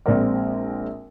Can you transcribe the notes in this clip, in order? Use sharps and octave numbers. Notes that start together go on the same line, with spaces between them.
A#1 G#3 C4 A#4 D5